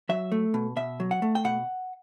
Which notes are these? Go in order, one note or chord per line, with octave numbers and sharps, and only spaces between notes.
F#3 E5
A3
B2
B2 E5
F#3
F#5
A3
G5
B2 F#5